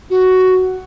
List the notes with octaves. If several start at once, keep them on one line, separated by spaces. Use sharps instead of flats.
F#4